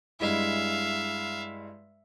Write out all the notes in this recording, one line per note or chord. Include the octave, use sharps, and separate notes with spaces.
G2 G#3 E4 E5 F5